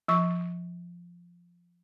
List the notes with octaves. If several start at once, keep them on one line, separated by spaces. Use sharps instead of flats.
F3 C#6